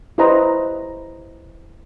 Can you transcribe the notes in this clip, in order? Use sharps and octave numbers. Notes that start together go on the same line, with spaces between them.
E4 G4 B4 C5 D#5 A#5